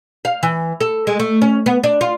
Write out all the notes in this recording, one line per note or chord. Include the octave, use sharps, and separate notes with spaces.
F5
E3
A4
G#3
A3
C#4
B3
D4
F4